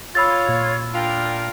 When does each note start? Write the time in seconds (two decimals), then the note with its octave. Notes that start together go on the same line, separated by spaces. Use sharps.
0.15 F4 C#5 B5 E6 A6
0.49 A#2
0.94 D4 F4 A#4 G5